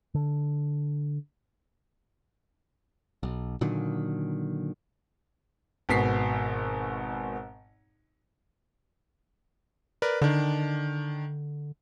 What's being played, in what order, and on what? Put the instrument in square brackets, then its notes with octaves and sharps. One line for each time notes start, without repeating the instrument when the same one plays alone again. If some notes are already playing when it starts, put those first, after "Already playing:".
[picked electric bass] D3
B1
A#2 D3 D#3 F#3
[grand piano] G#1 B2 B6 C7
[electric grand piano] A#4 B4 D5
[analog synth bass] D3 [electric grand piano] D#3 D4